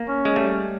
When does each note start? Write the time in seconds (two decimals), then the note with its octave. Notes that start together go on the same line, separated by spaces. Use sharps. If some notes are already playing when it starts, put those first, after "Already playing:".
Already playing: A#3
0.08 C#4
0.25 G#3
0.36 G3 A3